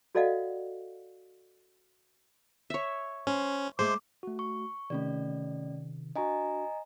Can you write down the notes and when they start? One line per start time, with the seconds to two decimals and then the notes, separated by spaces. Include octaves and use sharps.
0.15 F#4 A4 D5 D#5 F5 F#5
2.70 C#5 E5
3.27 C#4 C5
3.79 G#3 A3 C5 D6
4.23 A3 F#4
4.39 C#6
4.90 C3 D#3 A3 C#4 D5
6.16 D4 F#4 D#5 G#5 A#5